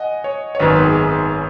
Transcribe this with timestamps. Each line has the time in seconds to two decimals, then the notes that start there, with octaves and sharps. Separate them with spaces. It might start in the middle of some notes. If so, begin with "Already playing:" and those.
Already playing: D#5 F#5 G#5
0.24 C#5
0.55 C#5
0.59 G#1 F#2 D#3 B3 B4
0.68 C#5
0.76 B4
0.83 G#4